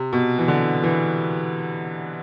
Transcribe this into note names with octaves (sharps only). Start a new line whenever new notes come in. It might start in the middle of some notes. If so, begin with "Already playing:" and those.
Already playing: C3
B2
E3
D3
E3